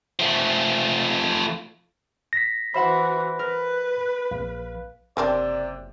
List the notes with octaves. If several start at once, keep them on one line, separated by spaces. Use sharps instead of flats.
F3 A3
A#6 B6
E3 F#4 C5 E5 F#5 B5
A#4 B4
A#1 F5
F#1 C3 A#3 C4 D4 C5 D5